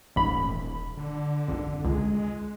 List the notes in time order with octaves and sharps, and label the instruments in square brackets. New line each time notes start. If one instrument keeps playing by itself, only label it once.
[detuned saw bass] D#1 [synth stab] A1 G#2 B5
[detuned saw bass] D3
[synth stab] G#1 F2
[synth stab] C#2 [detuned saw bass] G#3